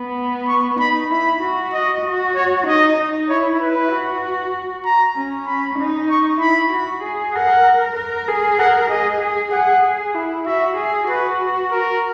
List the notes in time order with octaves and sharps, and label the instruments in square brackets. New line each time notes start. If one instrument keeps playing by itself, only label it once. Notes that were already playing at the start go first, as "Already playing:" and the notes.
Already playing: [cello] B3
[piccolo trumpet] C#6
[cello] D#4 [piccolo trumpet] B5
[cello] E4 [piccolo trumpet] B5
[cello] F#4
[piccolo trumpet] D#5
[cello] F#4
[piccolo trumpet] C#5
[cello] D#4 [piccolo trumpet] D#5
[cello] D#4
[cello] E4 [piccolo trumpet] C#5
[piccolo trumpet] B4
[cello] F#4
[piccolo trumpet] A#5
[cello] C#4
[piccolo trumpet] B5
[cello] D#4
[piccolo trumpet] C#6
[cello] E4 [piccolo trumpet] B5
[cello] F#4
G#4
[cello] A#4 [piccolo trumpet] F#5
[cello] A#4
G#4
[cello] A#4 [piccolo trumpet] F#5
[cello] G#4 [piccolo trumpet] D#5
[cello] G#4
[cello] G#4 [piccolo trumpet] F#5
[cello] G#4
E4
[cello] F#4 [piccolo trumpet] E5
[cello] G#4
[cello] F#4 [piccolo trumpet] B4
[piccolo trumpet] A#4